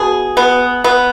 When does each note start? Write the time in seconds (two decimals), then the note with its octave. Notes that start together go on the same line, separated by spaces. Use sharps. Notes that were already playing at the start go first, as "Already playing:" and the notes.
Already playing: B2 G#4
0.37 B3
0.84 B3